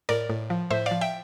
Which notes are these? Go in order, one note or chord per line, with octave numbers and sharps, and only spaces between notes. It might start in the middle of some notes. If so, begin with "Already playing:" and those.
A2 A#4 D5
A2
F3
A2 C5 E5
D5 F5
F3
E5 G5